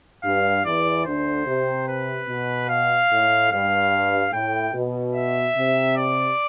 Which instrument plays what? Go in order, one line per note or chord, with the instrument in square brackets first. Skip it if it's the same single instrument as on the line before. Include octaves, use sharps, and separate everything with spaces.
[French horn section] G2 [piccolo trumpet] F5
[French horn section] E2 E3 [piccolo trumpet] D5
[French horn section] D2 D3 [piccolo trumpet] C5
[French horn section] C3
[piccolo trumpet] B4
[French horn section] B2
[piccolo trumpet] F5
[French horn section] A2
[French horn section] G2 [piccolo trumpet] F5
[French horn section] A2 [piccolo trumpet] G5
[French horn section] B2
[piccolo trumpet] E5
[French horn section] C3
[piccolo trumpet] D5